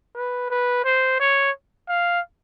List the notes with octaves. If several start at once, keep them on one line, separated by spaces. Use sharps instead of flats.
B4
B4
C5
C#5
F5